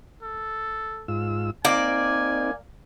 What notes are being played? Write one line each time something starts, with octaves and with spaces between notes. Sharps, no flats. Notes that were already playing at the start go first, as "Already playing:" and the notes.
A4
G#2 F4 E6
A#3 C4 D#4 D5 G#5